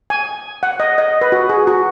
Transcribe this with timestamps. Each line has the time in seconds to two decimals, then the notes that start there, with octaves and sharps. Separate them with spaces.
0.10 G#5
0.63 F#5
0.80 D#5
0.98 D#5
1.21 B4
1.32 F#4
1.49 G#4
1.67 F#4